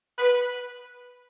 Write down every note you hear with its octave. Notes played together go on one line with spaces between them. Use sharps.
B4